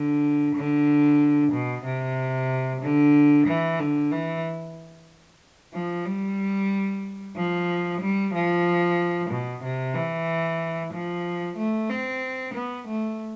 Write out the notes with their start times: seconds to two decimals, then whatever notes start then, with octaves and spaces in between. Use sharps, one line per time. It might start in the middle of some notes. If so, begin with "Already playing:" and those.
Already playing: D3
0.55 D3
1.52 B2
1.85 C3
2.82 D3
3.47 E3
3.80 D3
4.12 E3
5.73 F3
6.06 G3
7.36 F3
8.01 G3
8.34 F3
9.30 B2
9.63 C3
9.95 E3
10.93 F3
11.57 A3
11.89 C4
12.54 B3
12.88 A3